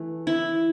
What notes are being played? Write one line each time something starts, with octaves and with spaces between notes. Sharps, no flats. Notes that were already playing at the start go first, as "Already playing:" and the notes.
Already playing: E3 A3
E4